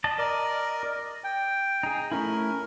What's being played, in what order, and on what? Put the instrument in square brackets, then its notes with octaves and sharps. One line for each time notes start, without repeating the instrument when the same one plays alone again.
[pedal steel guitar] D5 D#5 A5
[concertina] A#4 D5 [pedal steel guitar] D#5
[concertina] G5
[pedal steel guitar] D#4 G#4
[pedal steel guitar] A3 C#4 E4 [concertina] A#4